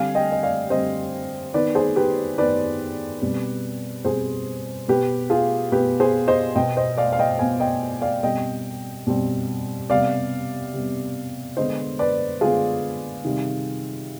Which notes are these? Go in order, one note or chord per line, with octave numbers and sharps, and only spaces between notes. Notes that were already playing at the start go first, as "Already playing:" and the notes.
Already playing: D3 G3 C4 F5 G#5
D#5 G5
D#5
D5 F5
D3 G3 C4 C5 D#5
D#3 B3 B4 D5
G#4 C5
G4 B4
D#3 B3 B4 D5
B2 G3 C4
B2 G3 C4 G#4 C5
B2 B3 G4 B4
F4 G#4
B2 B3 G4 B4
G#4 C5
C5 D#5
B2 B3 D#5 G5
C5 D#5
D5 F5
F5
D#5 G5
B2 B3 F5 G#5
D#5 G5
D5 F5
B2 G3 C4 D#5 G5
B2 G3 C4
C3 G3 B3 D5 F5
C3 G3 B3
D3 G#3 B3 C5 D#5
B4 D5
D3 G#3 B3 F4 G#4
C3 D#3 G3